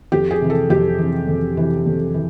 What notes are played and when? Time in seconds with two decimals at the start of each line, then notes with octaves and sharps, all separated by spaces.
0.12 F2 G4
0.31 G#4
0.41 C3 E3
0.50 A4
0.70 F2 G4
0.98 C3 E3
1.27 F2
1.57 C3 E3
1.86 F2
2.14 E3